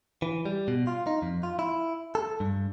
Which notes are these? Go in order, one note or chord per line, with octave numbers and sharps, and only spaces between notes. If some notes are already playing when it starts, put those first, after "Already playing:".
E3
G3
B2
F4
D#4
F2
F4
E4
A4
G2